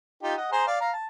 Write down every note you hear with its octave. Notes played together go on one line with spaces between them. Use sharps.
D#4 F4 G4
D#5 F#5
G#4 C5 A#5
D5 F5
F5 A#5
A5